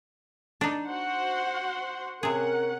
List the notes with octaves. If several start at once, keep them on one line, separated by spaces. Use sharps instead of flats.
D4 D#4
F#4 C5 F#5
C3 C#4 G#4 A#4 F#5